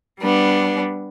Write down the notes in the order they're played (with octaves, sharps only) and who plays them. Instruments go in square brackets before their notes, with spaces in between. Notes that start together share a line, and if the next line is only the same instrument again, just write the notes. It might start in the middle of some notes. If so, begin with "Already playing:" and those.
[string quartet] G3 B3 D4